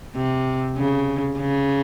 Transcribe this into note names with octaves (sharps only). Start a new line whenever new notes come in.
C3
C#3
C#3